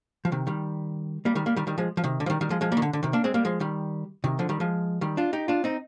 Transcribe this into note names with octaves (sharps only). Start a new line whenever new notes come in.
F3
C3 D#3
D#3 G3
G3 A#3
D#3 G3
G3 A#3
D#3 G3
D#3 G3
F3 G#3
F3
C3 D#3
D3
F3
D#3 G3
D#3 G3
F3 G#3
F3 G#3
G3 A#3
D#3
D3
D3
C3 D#3
A#3 D4
G#3 C4
G3 A#3
F3 G#3
D#3 G3
C3 D#3
D3 F3
D#3 G3
F3 G#3
D#3 G3
D4 F4
D#4 G4
D4 F4
C4 D#4